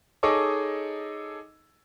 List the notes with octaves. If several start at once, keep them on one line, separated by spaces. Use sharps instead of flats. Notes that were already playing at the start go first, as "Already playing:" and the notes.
D#4 G#4 A4 C#5 D#5 D6